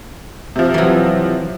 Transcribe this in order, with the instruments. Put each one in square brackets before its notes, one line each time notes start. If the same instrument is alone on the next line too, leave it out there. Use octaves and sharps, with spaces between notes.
[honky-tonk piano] C3 F3
[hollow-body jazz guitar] E3 F#3